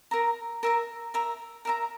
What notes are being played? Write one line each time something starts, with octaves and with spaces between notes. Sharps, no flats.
A#4 E5 A#5
A#4 E5 A#5
A#4 E5 A#5
A#4 E5 A#5